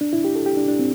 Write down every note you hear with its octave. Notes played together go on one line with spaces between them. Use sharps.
D4
E4
G4
A4
G4
D4
D4
C4